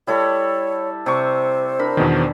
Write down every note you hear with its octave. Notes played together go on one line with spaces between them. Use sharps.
G3 E4 A4 C#5
C3 C5 D5 C#6
D4 A#4 B5
E2 B2 D#3